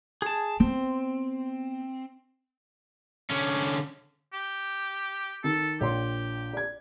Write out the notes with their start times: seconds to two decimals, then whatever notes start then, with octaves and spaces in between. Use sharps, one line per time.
0.22 G#4 A5
0.60 B3 C4
3.30 D3 C#4
4.33 G4
5.44 D#3 A4
5.81 A#1 G4 C#5 C6
6.53 D5 G#6